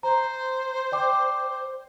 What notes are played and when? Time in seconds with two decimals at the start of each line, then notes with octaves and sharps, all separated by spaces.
0.03 C5 A#5
0.92 D5 G5 D6